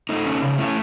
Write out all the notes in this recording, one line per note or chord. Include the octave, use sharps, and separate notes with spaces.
A3 D#4
C#4
C#3
A3 C#4 E4